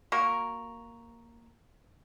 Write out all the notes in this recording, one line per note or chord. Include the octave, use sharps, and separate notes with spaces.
A#3 F#4 A#4